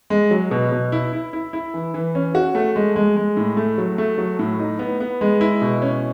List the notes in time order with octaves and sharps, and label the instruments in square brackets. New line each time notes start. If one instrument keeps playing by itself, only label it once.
[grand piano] G#3
F#3
B2
B2
E4
E4
E4
E4
E3
E3
C#4
F#4
A3
G#3
G#3
G#3
A2
A3
F#3
A3
F#3
A2
D#4
B3
B3
G#3
E4
B2
C#4